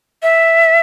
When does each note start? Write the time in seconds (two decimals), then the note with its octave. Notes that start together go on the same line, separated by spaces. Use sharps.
0.23 E5